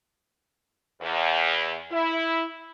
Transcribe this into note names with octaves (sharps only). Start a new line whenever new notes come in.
E2
E4